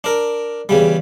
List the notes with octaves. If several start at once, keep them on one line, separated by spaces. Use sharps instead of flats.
D4 A#4
E2 C#3 G3